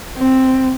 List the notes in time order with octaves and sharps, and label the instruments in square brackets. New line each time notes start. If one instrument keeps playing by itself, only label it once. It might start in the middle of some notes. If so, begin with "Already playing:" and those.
[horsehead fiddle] C4